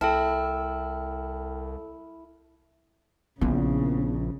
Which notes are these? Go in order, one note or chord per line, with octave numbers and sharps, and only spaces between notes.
C2 E4 A4 G5 A5 F6
A#1 C#3 B3 E4